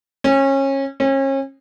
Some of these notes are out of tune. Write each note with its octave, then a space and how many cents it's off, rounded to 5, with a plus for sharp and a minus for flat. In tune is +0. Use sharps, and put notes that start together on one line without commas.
C#4 -25
C#4 -35